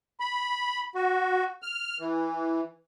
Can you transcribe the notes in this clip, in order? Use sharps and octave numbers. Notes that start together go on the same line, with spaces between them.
B5
F#4
F6
E3